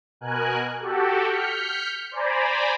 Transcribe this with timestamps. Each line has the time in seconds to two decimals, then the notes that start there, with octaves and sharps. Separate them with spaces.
0.21 B2 A#4 G#5 F#6
0.80 F#4 G4 A4
1.27 F6 G6 B6 C#7
2.11 C5 D5 G#5 A#5 B5